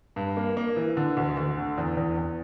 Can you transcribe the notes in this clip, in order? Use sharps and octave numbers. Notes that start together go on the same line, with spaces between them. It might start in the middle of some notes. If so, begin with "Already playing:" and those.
G2
A#3
A#3
E3
D3
D2
D2
D3
E2
E2
E2